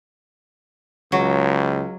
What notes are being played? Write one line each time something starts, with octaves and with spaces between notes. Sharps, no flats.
C#2 F#3